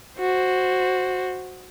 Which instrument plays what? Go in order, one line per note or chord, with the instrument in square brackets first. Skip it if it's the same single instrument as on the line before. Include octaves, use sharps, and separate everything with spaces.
[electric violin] F#4 C5